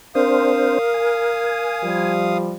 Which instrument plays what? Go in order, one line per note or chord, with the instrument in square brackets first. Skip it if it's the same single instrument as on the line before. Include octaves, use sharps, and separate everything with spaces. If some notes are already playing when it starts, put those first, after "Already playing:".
[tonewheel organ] C4 D4 C5 [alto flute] A#4 [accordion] F5 D#6
[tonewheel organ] G#5
[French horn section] F3 G3